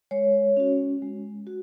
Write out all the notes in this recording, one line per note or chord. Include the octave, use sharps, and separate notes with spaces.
G#3 C#5
C#4 F#4
G#3
F#4